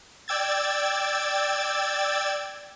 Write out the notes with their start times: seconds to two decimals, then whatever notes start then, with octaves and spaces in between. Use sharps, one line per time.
0.28 D5 G5 E6 G#6 A6